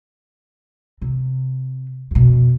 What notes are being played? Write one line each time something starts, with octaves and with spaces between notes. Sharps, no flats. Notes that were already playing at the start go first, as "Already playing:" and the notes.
C3
F2 B2